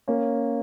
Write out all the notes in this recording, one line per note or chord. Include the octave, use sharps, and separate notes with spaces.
A#3 C#4